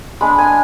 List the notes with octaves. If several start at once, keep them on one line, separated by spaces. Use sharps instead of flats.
G#3 D4 B5
G#5